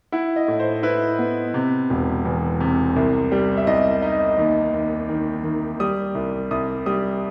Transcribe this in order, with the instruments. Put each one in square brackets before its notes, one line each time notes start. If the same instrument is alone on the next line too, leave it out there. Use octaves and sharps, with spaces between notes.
[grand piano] E4 F#5
D#5
A2
C5
E4 B4
B3
C3
E1
E2
C3
C2
G3
E5
C2 D#5
D#4
D#2
D#2
D#3
D#3
G3 D#6
C2
C2 D#6
G3 D#6